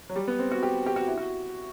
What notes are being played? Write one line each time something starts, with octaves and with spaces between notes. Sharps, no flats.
F#3
G3
B3
C4
F#4
G4
G4
F#4
E4
F#4